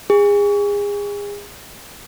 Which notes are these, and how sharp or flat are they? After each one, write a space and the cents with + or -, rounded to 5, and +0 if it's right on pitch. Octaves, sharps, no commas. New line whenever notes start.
G#4 -30